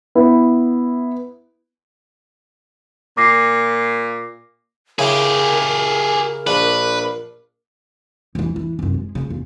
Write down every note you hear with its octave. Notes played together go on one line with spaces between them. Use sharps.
B3 E4
A#2 D6 A#6 C7
C#3 E4 G4 G#4 A#4
A#1 D4 B4
E2 E3
E3
F1 F#2
G#3
F#2 C#3
E2